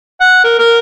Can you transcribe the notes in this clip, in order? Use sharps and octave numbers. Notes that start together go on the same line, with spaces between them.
F#5
A#4
A#4